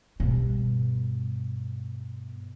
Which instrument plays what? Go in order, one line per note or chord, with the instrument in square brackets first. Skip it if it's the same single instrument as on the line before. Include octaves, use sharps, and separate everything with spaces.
[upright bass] G2 B2